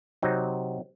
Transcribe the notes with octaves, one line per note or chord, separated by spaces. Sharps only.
C3 F#3 C4 D#4